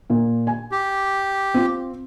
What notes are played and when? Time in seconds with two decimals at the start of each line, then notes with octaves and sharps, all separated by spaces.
0.10 A#2
0.47 G#5
0.71 G4
1.54 C4 F4